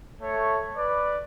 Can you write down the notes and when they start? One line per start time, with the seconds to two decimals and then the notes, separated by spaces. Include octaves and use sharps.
0.22 A3 C#5
0.77 B4 D5